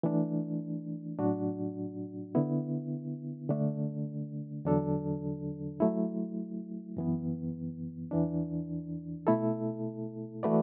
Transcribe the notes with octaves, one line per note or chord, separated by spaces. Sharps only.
E3 A3 D4
A2 F#3 D4 F#4
D3 B3 E4
D3 A3 D4
E2 D3 F#3 D4 A4
F#3 A3 E4
F#2 E3 B3
E2 E3 D4
B2 A3 E4 A4
E3 A3 F#4 B4 D5